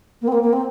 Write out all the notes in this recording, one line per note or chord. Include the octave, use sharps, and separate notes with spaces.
A#3
C4
A#3
A#3
C4